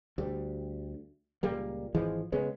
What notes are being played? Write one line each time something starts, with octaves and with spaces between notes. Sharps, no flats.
D2 G3
C#2 A#2 G3 A#3
G#1 E3 F3 G#3
C#3 G#3 B3 C#4